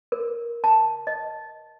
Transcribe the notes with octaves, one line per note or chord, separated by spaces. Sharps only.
A#4
A5
D#5